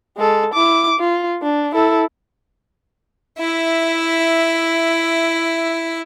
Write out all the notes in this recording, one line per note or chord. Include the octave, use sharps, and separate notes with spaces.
G#3 A4
E4 D6
F4
D4
E4 A4
E4 E5